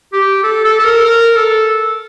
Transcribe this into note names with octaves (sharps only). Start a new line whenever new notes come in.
G4
A4
A4
A4
A#4
A#4
A4